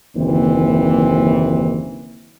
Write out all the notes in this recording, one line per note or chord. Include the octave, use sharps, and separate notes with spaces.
F#1 D#2 E3 C4